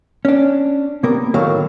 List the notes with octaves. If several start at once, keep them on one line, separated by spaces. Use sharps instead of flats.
C#4 D4
C3 A#3 B3 A#4
A2 D3 D#3 F#3 A#4 F5